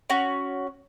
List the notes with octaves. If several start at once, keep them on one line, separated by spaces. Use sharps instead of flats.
C#4 F#4